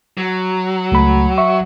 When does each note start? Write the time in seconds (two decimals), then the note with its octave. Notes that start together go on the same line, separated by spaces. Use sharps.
0.17 F#3
0.92 C#2 A3 B5
1.38 E5 C#6